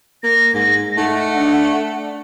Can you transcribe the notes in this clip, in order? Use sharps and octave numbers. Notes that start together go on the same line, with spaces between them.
A#3 A#6
G#2
A3 D#4 F#5
D4